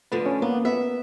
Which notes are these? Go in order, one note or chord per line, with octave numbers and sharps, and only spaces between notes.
D3 F3 A3 B4
C#4
A#3 B3
B3 E5